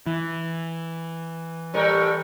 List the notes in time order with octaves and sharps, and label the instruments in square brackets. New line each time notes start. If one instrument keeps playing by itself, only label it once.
[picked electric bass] E3
[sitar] A2 G3 A#4